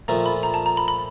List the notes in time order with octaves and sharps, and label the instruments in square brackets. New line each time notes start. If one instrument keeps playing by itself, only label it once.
[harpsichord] A#2 F3 A3 [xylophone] A#5
[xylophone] B5
A#5
A5
A#5
B5
B5